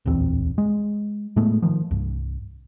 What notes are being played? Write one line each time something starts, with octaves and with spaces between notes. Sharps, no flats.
D1 A#1 E2 C4
G#3
A2 G#3 A3 B3
D#3 F3
C2 G2